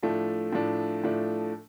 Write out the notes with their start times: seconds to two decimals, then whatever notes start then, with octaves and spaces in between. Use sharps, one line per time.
0.02 A2 F3 A3 D4
0.53 A2 F3 A3 D4
1.04 A2 F3 A3 D4